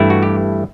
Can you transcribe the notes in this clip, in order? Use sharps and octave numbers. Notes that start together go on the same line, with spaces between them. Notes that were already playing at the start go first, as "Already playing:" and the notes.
Already playing: G2 E3 A3 E4
F#4
G4